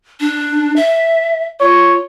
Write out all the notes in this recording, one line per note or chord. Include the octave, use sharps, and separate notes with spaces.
D4
E5
F4 C#5